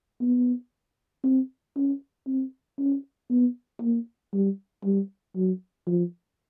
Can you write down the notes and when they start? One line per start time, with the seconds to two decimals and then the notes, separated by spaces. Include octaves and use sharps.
0.21 B3
1.24 C4
1.76 C#4
2.27 C4
2.79 C#4
3.30 B3
3.81 A#3
4.33 G3
4.85 G3
5.36 F#3
5.87 F3